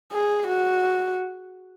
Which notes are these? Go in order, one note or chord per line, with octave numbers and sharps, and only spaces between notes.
G#4
F#4